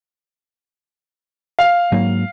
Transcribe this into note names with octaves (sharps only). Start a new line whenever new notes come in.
F5
G#2 F#3 A#3